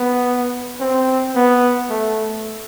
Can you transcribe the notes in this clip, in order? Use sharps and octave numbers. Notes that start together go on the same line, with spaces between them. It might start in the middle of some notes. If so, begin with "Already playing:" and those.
Already playing: B3
C4
B3
A3